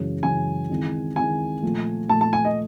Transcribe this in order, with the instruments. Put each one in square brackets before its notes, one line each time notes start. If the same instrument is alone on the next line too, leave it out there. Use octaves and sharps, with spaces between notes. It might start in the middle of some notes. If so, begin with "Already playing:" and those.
Already playing: [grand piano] F#2 C#3 E3 G#3 C#4
[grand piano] F#2 C#3 E3 G#3 C#4 [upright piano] G#5
[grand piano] D#3 G#3 C4 E4
[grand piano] D#3 G#3 C4 E4 [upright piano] G#5
[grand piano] A#2 F3 A3
[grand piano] A#2 F3 A3 [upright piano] A5
[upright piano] A5
G#5
D#5